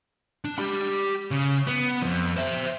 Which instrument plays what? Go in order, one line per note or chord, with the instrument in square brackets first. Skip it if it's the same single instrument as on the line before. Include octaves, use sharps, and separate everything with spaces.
[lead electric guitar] D4
G4 B5
C#3
B3
F2
C5 E5